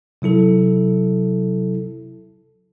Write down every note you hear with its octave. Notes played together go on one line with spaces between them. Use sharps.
C3 F#3 E4 A4